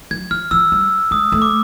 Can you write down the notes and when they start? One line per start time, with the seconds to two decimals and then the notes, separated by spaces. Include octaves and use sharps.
0.11 F#3 G#6
0.31 F3 F6
0.51 F3 E6
0.72 G3
1.11 G#3 D#6
1.32 A3
1.42 D6